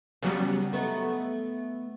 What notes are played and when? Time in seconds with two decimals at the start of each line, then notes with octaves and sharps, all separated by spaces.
0.23 C#3 F#3 G3 B3 D4 F#4
0.73 A3 B3 D#4